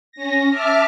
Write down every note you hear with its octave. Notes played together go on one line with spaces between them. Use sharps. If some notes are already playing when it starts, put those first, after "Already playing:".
C#4 A#6
E5 A5 D6 F6